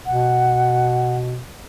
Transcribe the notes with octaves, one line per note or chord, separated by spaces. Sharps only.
B2 F#5